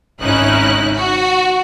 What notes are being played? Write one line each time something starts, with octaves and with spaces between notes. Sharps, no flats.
G#1 C#2 C#4 D#4 E4 F#6
F#4